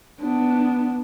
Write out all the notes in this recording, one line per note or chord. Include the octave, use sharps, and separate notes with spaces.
B3 D4